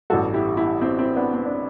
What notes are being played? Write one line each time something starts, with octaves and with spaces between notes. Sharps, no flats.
A1 G2 E3 F#4 A4
E4 G4
E4 G4
C4 E4
C4 E4
B3 D4
C4
D4